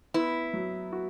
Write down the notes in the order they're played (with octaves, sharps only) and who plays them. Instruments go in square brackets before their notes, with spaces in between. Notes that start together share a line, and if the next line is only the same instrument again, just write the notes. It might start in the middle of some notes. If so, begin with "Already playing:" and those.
[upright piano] B3 [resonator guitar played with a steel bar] E4
[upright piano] F#3
F#4